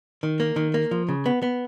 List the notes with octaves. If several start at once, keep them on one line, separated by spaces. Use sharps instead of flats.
D#3
A#3
D#3
A#3
F3
C#3
B3
B3